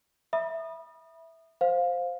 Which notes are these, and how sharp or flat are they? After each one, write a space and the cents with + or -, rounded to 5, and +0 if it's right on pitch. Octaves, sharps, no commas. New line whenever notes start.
E5 -5 B5 -30 D#6 -25
C5 +0 F5 +15